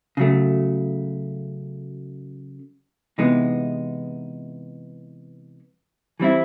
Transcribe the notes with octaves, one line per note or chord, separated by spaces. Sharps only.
C#3 F#3 A3
C3 E3 G#3 B3 D#4
E3 G3 C4 E4